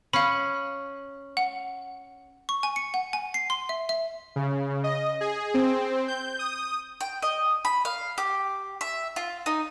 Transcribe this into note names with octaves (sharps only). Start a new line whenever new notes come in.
C#4 F5 B5
F#5
C#6
G#5
C#7
F#5
G#5
C7
C6
E5
E5
C#3
D#5
G#4
C4
G6
D#6
G5
D#5
B5
F5
G4
E5
F4
D#4